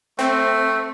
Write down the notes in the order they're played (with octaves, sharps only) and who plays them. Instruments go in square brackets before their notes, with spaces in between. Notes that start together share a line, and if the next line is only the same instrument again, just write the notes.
[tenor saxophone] A3 [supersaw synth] C4